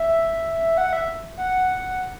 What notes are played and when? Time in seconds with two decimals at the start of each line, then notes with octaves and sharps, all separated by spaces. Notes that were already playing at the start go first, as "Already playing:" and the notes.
Already playing: E5
0.78 F#5
0.93 E5
1.37 F#5